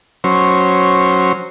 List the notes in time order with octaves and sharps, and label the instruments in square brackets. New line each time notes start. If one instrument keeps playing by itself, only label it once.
[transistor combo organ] F#3 C#4 C5